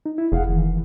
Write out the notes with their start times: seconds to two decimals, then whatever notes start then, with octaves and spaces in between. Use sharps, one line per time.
0.06 D#4
0.18 E4
0.32 F1 G#4 F5 F#5
0.50 D#3 E3